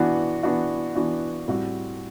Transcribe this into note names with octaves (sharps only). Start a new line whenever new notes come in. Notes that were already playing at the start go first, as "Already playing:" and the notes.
Already playing: E3 B3 D4 F#4
E3 B3 D4 F#4
E3 B3 D4 F#4
A2 G3 C4 F#4